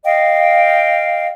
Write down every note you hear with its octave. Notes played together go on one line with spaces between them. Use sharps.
D#5 F5 G5